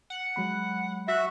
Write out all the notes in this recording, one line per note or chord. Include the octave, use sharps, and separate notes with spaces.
F#5
F#3 G#3 B5
F#4 E5